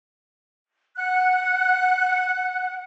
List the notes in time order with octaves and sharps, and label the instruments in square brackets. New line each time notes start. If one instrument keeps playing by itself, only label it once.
[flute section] F#5 F#6